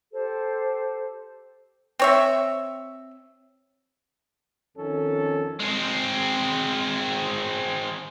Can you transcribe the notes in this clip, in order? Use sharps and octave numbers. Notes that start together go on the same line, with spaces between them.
G4 A4 C5
C4 C#5 E5
F2 D#3 C#4 A4
G#3 C4